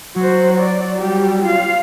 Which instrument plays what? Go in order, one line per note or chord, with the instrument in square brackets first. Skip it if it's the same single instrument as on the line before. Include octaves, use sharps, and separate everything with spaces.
[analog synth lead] F#3 [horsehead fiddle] F#4 C5
[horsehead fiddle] D5
G3 G4
F4 F5